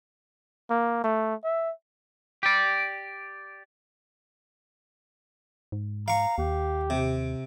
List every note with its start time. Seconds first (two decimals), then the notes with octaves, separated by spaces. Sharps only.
0.70 A#3
1.04 A3
1.44 E5
2.43 G4 D5
5.72 G#2
6.08 F5 A#5 C#6
6.38 D#2 G4
6.90 C3